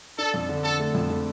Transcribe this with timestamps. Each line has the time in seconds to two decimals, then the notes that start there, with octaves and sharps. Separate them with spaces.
0.18 D4 A4
0.34 F2
0.49 D3
0.64 D3 A4
0.80 A3
0.94 F2
1.10 D3